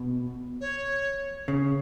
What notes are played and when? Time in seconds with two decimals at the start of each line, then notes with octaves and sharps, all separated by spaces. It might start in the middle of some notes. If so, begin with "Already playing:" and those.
Already playing: B2
0.61 C#5
1.48 C#3